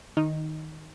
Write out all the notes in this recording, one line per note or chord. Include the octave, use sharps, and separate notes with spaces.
D#3 D#4